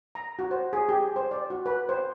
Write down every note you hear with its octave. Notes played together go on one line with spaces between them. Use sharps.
A#5
F#4
C5
G#4
G4
C5
D5
F#4
B4
C5